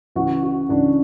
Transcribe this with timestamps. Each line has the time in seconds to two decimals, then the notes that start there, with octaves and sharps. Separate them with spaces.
0.15 C#2 C#3 E3 F#4
0.43 F#4
0.69 C#2 C#3 E3 D4